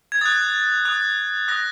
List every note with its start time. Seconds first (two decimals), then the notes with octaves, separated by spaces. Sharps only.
0.12 G#6
0.21 D#6 F#6 A6
0.85 D#6 F#6
1.48 D#6 F#6 A#6